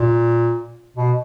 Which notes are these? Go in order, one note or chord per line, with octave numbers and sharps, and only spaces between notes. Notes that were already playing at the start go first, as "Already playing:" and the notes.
Already playing: A#2
B2